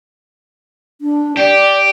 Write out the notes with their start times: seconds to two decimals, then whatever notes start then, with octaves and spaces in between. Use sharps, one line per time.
1.01 D4
1.37 G4 D5